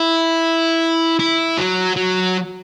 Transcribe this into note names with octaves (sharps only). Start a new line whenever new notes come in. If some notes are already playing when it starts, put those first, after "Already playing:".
Already playing: E4
E4
F#3
F#3